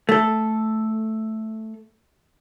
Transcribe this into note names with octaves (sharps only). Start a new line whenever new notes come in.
A3 A4